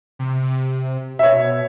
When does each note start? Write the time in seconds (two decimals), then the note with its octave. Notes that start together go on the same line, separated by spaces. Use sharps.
0.19 C3
1.19 B2 C#5 E5